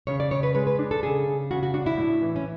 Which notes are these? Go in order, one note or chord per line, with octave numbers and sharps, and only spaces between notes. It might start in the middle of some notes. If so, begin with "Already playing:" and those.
C#3 C#5
D5
C#3 C#5
B4
G#3 B4
B4
D4
A4
C#3 G#4
C#3
C#3 F#4
F#4
D4 F#4
E4
A2
E3
C#4